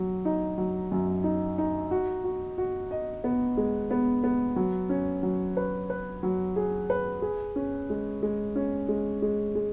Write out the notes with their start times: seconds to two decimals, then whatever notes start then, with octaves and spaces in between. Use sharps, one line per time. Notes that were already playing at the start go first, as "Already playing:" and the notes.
Already playing: F#3
0.25 D#4
0.58 F#3
0.92 F#2
1.24 D#4
1.58 D#4
1.91 F#4
2.24 F#4
2.58 F#4
2.91 D#5
3.24 B3
3.57 G#3
3.91 B3
4.24 B3
4.56 F#3
4.89 C#4
5.23 F#3
5.57 B4
5.90 B4
6.23 F#3
6.56 G#4
6.90 B4
7.22 G#4
7.56 C#4
7.90 G#3
8.23 G#3
8.56 C#4
8.89 G#3
9.22 G#3
9.55 G#3